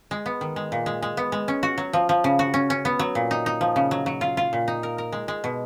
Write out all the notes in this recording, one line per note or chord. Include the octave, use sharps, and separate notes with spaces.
G#3
B3
D#3
G#3
A#2
G#3
G#3
B3
G#3
C#4
F#4
F#3
F3
F3
C#3
F#4
C#4
C#4
B3
F#3
A#2
D#4
D#4
F3
C#3
F#3
F#3
F4
F4
A#2
D#4
A#4
A#4
G#3
G#3
B2